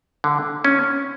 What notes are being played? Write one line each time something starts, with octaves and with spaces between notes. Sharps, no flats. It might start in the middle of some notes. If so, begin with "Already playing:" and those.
D3
C#4